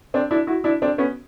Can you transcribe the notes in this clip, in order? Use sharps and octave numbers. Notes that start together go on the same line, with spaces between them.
C4 D4
D4 E4
E4 F#4
D4 E4
C4 D4
B3 C#4